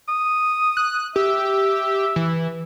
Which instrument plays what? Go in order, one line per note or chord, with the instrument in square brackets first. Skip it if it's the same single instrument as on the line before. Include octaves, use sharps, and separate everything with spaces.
[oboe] D#6
[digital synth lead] F#6
[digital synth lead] G4 [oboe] E5
[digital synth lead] E3